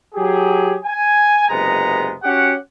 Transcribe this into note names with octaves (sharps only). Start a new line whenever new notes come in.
F#3 G4 G#4
G#5
F#1 C3 G#3 B3 A#5
C#4 F#4 G4 F#5